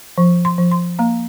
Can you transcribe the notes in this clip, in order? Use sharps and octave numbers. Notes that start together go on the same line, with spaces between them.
F3
C6
F3
C6
A#3 A#5